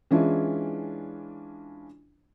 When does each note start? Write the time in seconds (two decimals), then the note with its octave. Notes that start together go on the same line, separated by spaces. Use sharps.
0.11 E3 G#3 C#4 D4 E4 F4